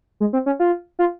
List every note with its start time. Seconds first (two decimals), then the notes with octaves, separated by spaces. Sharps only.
0.20 G#3
0.33 C4
0.46 C#4
0.60 F4
0.99 F4